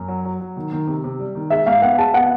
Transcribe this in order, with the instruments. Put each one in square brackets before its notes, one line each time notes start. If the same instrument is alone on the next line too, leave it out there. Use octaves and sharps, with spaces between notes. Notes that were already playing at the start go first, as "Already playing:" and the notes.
Already playing: [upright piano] F#2
F#3
F#3
F#3
D#3
D#3
C3
C3
G3
D#3
[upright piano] G#3 [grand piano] E5
[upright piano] G#2 [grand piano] F5
[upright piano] B3 [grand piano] F#5
[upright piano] G#3 [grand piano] A5
[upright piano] B3 [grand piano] F#5